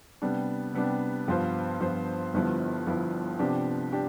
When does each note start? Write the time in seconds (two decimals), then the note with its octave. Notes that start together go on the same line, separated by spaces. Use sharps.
0.22 C3 G3 B3 D4
0.74 C3 G3 B3 D4
1.28 G2 F3 B3 F4 C5
1.80 G2 F3 B3 F4 C5
2.34 G1 G2 F3 B3 E4
2.86 G1 G2 F3 B3 E4
3.39 C3 F3 B3 D4 G4
3.92 D4 G4